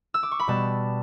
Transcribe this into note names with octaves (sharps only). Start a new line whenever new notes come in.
E6
D6
C#6
B5
B2 G3 B3 A5